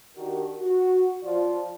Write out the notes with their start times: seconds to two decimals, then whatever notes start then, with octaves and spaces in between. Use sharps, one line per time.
0.16 D#3 D4 F#4 G4 A#4
0.59 F#4
1.23 F3 F4 D5